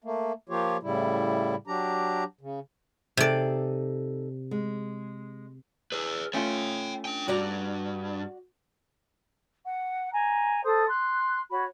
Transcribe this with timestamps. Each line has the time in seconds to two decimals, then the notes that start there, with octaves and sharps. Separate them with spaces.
0.04 A3 A#3
0.49 F3 A#3 F4 G4 C#5
0.83 A2 C#3 G3 E4
1.67 F#3 D4 G4 A#5
2.41 C#3
3.17 C3 D#4 G#4 A4 D5
4.51 G#3
5.92 G#4 B4
6.34 A3 C#4 F4 C#5 G5
7.05 D4 G5
7.28 G2 F#4 D5 A#5
9.65 F#5
10.11 G#5 A#5
10.63 A4 C5 D#6
10.88 C6 F#6
11.50 F#4 C#5 B5